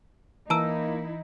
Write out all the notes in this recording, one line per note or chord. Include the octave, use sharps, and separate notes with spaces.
E3 A#3 D#4 E4 A5 A#5 E6